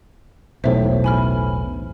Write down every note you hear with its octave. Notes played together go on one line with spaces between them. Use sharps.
E1 B1 A2 C5 E5
G#5 B5 F6